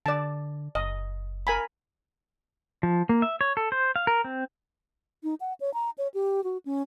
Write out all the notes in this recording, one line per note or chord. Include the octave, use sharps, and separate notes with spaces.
D3 D5 A5
F#1 D#5
A#4 G#5 B5
F3
A#3
E5
C#5
A4
C5
F5
A#4
C4
D#4
F#5
C#5
A#5
C#5
G4
F#4
C#4